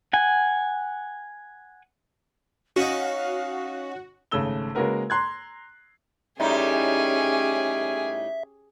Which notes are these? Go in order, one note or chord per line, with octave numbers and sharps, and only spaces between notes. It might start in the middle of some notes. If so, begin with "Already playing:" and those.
F#5 G#5
C#4 D#4 F#4 F5
G#1 C#3 A3 E6 G7
C#3 G#3 A#3 F#4 A#4 B4
A#5 C6 F#6 G#6
A2 G3 C#4 D#4 G4 G#4 E5